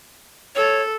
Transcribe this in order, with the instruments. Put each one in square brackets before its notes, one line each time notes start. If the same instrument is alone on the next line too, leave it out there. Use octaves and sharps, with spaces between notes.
[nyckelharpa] A4 [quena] C#5